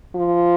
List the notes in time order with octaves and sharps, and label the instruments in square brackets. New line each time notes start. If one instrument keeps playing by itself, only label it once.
[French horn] F3